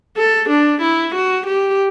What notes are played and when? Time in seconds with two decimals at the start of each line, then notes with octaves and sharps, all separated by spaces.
0.17 A4
0.49 D4
0.81 E4
1.15 F#4
1.46 G4